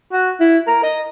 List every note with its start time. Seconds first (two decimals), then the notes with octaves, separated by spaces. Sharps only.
0.13 F#4
0.40 E4
0.67 A#4
0.83 D#5